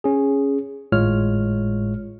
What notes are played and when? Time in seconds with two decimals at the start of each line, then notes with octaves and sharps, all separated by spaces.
0.04 C#4 G#4
0.92 G#1 A2 G#3 F4 C#5 F6